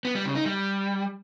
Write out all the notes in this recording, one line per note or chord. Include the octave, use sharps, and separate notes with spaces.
B3
G3
C#3
D#4
G3